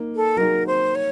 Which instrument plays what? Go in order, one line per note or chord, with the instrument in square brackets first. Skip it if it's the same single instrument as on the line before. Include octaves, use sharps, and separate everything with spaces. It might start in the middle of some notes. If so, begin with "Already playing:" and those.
Already playing: [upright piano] A#3 D#4
[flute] A4
[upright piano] F#3 A#3 D#4 G#4 [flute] A#4
[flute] C5
C#5